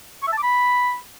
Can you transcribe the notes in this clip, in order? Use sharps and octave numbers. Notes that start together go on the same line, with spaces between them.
C#6
E5
A5
D6
B5